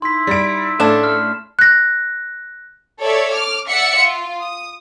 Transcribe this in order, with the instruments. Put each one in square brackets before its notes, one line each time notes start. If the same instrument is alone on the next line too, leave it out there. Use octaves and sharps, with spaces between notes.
[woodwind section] D#4 E4 [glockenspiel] C6 B6
[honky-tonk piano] G3 D7
[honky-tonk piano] A2 [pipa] C#3 D4 E4 [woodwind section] A4 [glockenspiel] E7
[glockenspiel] F6
[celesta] F#6 A#6
[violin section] A4 C#5 D5 E5
D6 F6
D5 E5 F#5 C#7
F4
D#6